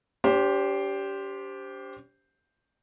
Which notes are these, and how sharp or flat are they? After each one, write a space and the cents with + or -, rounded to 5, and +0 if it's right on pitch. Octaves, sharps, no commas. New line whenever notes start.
D4 -45 G4 +0 C5 +0